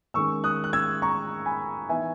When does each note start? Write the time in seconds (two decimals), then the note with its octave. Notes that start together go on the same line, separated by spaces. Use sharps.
0.14 D#3 G#3 C#4 C#6 E6
0.44 D#6 F#6
0.64 F#6
0.73 E6 G#6
1.02 A#5 C#6
1.46 G#5 B5
1.89 E3 B3 D#4 E5 G#5